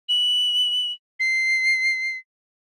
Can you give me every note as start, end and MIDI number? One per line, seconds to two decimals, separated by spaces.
0.09 0.91 102
1.20 2.17 96